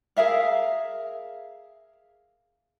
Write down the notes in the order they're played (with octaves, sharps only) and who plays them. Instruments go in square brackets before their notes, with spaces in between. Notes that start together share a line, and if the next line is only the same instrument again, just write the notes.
[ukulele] G#4 A#4 E5 F5